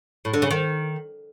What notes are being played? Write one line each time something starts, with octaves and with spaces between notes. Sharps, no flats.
A2
D3
C#3
D#3